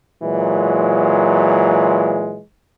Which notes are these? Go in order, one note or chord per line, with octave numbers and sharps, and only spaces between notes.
A#2 E3 F#3 G#3